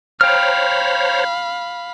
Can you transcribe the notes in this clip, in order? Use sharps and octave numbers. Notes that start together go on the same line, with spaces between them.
C5 C#5 F5 G5 A#5 B5 F6